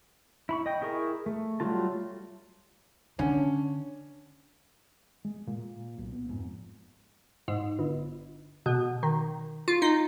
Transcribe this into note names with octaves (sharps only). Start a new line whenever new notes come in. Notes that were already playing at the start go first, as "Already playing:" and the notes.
E4 B5 C#6
D#5 G5
E4 G#4 A#4 C#6
A3
F#3 G3 A3 F4 A5
D3 C#4
G#3
A#2
B1
B3
F1 G#2
G#2
G1
B2
D#3
F4
D#4